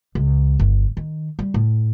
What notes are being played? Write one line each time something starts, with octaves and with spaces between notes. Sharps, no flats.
C#2
G1
D#3
G3
A2